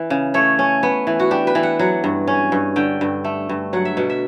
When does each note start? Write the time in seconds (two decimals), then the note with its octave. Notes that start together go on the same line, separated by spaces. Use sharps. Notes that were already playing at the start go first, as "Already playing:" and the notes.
Already playing: E3
0.10 C#3
0.34 A3 C#5
0.59 C#4
0.83 B3
1.07 E3
1.20 F#4
1.31 D4 G4
1.47 B4
1.55 E3
1.63 F#5
1.79 F#3 F#5
2.04 G2
2.27 C#4
2.52 G2
2.76 D3 G5
3.01 G2
3.24 A3
3.49 G2
3.73 F#3 F#5
3.85 E5
3.97 B2 F#5
4.10 E5